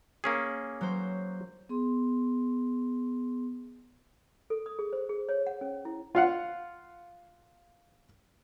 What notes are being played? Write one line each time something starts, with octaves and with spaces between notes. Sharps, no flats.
A#3 C#4 G#4
F#3 C5
B3 G#4 C6
A4
D#6
G#4
C5
G#4
C#5
F#5
C#4
E4
F4 F5 F#5